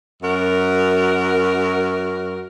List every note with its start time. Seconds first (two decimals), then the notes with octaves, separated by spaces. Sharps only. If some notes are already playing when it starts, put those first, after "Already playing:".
0.22 F#2 F#4 A#4